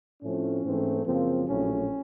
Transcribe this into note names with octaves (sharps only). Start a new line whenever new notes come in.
A2 F3 A3 C4 C#4
G#2 E3 A3 C4
F#2 C#3 F3 A#3 C4
A#1 A2 F#3 C#4